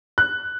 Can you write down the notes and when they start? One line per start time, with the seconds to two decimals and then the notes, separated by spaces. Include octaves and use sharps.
0.18 F#6